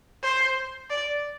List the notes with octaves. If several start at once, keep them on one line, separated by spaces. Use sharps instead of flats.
C5
D5